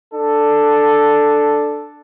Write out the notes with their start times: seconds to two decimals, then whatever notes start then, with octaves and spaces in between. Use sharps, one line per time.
0.14 D4 A4